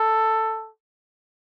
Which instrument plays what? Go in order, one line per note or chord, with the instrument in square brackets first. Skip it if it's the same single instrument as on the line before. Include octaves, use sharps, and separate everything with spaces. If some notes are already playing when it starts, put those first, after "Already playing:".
Already playing: [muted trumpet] A4